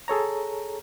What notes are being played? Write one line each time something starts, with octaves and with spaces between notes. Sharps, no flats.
G#4 A4 C#5 A#5